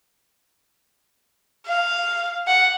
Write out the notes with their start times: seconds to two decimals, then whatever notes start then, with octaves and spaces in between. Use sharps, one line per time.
1.67 F5
2.47 F#5